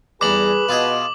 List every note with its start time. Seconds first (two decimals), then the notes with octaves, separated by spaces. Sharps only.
0.21 E2 G3 G#4 B4 A#5 D6 F#7
0.69 B2 F4 G#4 D#5